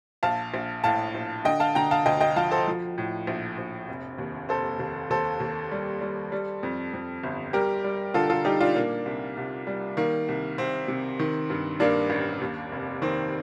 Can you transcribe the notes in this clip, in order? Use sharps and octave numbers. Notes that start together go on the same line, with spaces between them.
A#1 F5 A5
A#1
A2 F5 A5
A#1
D3 D#5 G5
F5 A5
D3 G5 A#5
F5 A5
D2 D#5 G5
D#5 G5
F3 F5 A5
A4 C5
F3
A2
A#1
A#1
F1
D#2
F1 A4 C5
D#2
D#2 A4 C5
D#2
G3
G3
G3
F2
F2
G1
G3 G4 A#4
G3
D3 F4 A4
F4 A4
G3 D#4 G4
D4 F4
A#2 A#3 D4
C2
C2
G3
D#3 A#3
C2
C2 C4
C3
D#3
G2
G2 A#3 D4
A1
D#2
F1
D#3 C4